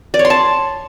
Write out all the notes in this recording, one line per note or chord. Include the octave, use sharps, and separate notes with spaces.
D5
C#5
C6
A5